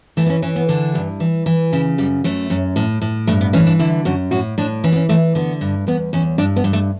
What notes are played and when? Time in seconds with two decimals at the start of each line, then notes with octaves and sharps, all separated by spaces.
0.17 E3 A3
0.26 B3
0.30 C#4
0.42 E3 C#4
0.56 B3
0.69 D3 D4
0.95 G2
1.20 E3
1.46 E3
1.73 C#3 E4
1.98 F#2 G3
2.24 F#2 A3
2.50 F#2
2.76 A2
3.02 A2
3.27 G2 A3
3.41 B3
3.53 E3 C#4
3.66 D4
3.79 D3 E4
4.05 F#2 F#4
4.31 A2 F#4
4.58 A2 D4
4.84 E3 C#4
4.92 B3
4.96 C#4
5.09 E3 A3
5.35 D3 B3
5.61 G2
5.87 E2 B3
6.13 E2 C#4
6.38 G2 D4
6.56 B3
6.64 G2
6.73 A3